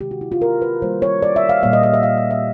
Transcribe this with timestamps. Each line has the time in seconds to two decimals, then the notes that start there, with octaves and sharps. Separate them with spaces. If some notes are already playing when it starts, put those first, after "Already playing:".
0.01 C3 D#3 G#3 G4
0.11 F#4
0.21 E4
0.32 F4
0.42 A#4
0.62 B4
0.82 D#3 G3 A#3 C5
1.02 C#5
1.23 D5
1.36 E5
1.49 F5
1.63 A#2 G3 A#3 F5
1.73 D#5
1.83 D#5
1.94 E5
2.03 F5
2.18 F5
2.31 E5